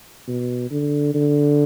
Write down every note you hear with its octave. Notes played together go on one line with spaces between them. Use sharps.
B2
D3
D3